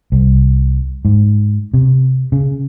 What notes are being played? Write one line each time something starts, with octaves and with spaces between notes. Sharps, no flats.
C2
G#2
C3
C#3